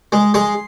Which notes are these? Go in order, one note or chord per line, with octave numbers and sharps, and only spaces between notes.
G#3
G#3 C6